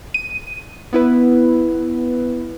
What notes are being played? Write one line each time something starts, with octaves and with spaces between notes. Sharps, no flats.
D#7
B3 E4 B4